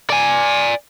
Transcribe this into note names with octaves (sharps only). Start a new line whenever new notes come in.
D5 G#5